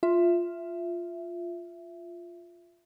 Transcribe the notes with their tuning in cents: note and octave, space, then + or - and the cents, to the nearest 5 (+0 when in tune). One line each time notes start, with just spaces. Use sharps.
F4 +0 E5 +15